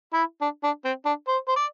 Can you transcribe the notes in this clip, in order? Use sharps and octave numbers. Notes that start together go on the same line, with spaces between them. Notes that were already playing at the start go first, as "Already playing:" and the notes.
E4
D4
D4
C4
D4
C5
C5
D5